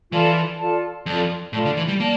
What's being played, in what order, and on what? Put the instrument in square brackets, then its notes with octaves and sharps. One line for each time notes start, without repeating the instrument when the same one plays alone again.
[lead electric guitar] E3 [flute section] F4 A4 D5 A5
[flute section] F4 A4 D5 A5
[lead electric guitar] F2 [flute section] F4 A4 D5 A5
[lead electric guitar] A2 [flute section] F4 A4 D5 A5
[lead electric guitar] D3
E3
G3
[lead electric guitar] A#3 [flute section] D5 A5